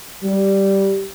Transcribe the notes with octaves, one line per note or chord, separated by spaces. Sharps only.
G3